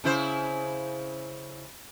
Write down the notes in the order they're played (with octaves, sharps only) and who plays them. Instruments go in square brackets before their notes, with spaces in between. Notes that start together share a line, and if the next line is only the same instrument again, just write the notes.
[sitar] C#3 E4 C5